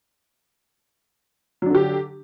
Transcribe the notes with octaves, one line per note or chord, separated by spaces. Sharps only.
D3 F#3 D4 G4